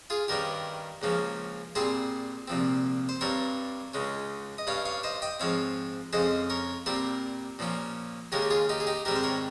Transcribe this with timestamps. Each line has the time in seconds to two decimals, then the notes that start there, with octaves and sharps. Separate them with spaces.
0.10 F4 G#4
0.28 G2 D#3 G3 C#4 G4 A#4
1.02 C#2 C#3 F3 A#3 C#4
1.75 A#2 G3 C4 G#4 C5
2.48 C2 A#2 F3 C4
3.09 C5
3.21 G2 G3 C4 A#4 C#5
3.94 C#2 C#3 G#3 C#4
4.58 D#5
4.67 G2 G3 C#4 C#5 F5
4.85 C#5 F5
5.03 C5 D#5
5.22 D#5 G5
5.40 G#2 F3 C4 C#5 F5
6.13 F2 C#3 G#3 C#4 C5 D#5
6.50 A#4 C#5
6.86 A#2 G3 C4 G4 A#4
7.59 A#2 F3 A#3 C#4
8.32 D#2 C#3 G#3 C#4 G4 A#4
8.42 G4
8.50 F4 G#4
8.69 D#4 G4
8.80 G#4
8.87 D#4 G4
9.05 G#2 D#3 G3 C4 G4 A#4
9.16 C5
9.23 A#4 C#5